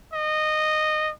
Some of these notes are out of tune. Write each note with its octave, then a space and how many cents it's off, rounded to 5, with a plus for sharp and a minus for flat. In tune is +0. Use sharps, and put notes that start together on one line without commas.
D#5 -15